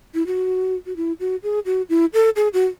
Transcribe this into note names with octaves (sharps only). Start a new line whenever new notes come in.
E4
F#4
F#4
E4
F#4
G#4
F#4
E4
A4
G#4
F#4